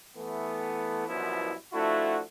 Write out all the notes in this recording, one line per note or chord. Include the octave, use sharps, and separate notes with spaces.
E3 A3 B3
C2 F#2 B2 F3 B3 E4
F3 A3 D4 E4 F#4